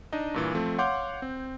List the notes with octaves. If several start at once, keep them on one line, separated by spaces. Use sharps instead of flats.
D4 D#4 D#5
G2 A#2 E3
F3 A3 C4
C#5 F5 F#5 C6 D6 G6
C4